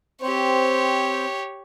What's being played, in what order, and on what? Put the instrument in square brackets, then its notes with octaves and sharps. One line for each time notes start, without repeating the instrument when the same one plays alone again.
[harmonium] C4 C5 [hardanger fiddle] G4 C#5